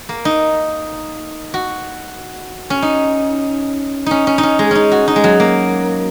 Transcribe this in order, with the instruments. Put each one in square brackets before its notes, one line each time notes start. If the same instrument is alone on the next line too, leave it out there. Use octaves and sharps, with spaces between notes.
[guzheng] A#3
D#4
F#4
C#4
D#4
C#4 D#4
C#4
D#4
C#4
G#3
C#4 D#4
F#4
D#4
G#3
F#3
A#3